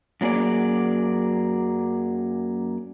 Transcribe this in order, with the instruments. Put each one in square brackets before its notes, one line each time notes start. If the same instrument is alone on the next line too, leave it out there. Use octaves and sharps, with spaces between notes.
[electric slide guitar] F#2 F#3 A#3 G#4 D5